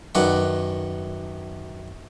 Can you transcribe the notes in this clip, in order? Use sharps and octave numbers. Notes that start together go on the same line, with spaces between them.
F#2 D#3 D4 B4 F#5